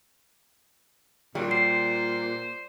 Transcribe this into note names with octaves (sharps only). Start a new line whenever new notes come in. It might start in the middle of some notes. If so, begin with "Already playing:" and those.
A#2 F#3 G3
C5 C7